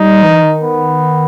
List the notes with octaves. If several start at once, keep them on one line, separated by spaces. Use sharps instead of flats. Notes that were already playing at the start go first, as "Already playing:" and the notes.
Already playing: G3 D#4
E3
D#3
B3